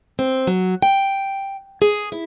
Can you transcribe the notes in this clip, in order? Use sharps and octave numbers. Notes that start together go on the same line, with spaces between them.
C4
F#3
G5
G#4
E4